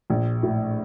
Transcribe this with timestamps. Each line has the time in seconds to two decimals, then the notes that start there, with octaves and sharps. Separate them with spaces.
0.10 A#1
0.43 A2